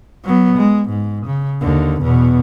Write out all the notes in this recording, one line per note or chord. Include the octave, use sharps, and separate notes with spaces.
F#3 B3
G#3
G#2
C#3
D#2 D3
E2 B2